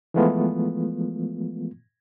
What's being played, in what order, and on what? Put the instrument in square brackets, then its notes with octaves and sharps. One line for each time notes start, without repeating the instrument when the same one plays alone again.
[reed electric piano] E3 F3 G#3 A3 B3 F4